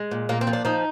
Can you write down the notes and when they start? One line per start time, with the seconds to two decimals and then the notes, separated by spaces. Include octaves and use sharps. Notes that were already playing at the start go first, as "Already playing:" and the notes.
Already playing: G#3
0.11 A#2
0.29 A#2 A#3
0.41 C4
0.47 F3
0.53 D4
0.65 F3 D#4